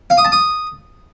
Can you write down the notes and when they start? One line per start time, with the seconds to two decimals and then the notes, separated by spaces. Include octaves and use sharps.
0.10 F5
0.17 D#6
0.25 A5
0.32 D#6